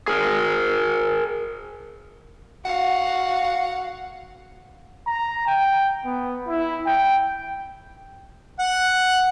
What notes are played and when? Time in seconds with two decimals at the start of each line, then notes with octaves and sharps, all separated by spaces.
0.08 G#4 A#4
2.65 F#4 F5 F#5
5.07 A#5
5.47 G5
6.05 B3
6.48 E4
6.86 G5
8.60 F#5